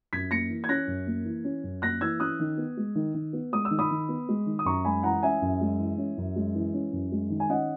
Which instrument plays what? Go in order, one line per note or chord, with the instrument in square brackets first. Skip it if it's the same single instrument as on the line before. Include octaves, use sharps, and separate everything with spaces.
[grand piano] F#2 G#6 B6
A#3 A#6 C#7
E3
G#6
C#4 F#6 A#6
F#2
A#3
E3
C#4
F#2
A#3 F#6 A#6
E3 E6 G#6
C#4 D#6 F#6
D#3
B3
G#3
D#3
D#3
B3
G#3 D#6
E6
D#3
B5 D#6
D#3
B3
G#3
D#3
D#6
F#2 A#5 C#6
G#3 G#5 B5
E3 F#5 A#5
C#4 E5 G#5
F#2
G#3
E3
C#4
F#2
G#3
E3
C#4
F#2
G#3
D#3
G#5
C#4 D#5 F#5